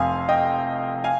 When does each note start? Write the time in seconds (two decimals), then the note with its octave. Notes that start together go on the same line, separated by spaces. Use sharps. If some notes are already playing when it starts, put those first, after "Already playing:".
Already playing: F1 F2 C3 F5 G#5 C6 D#6
0.29 D#5 G5
1.04 F5 G#5